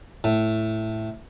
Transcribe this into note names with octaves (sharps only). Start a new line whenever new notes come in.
A2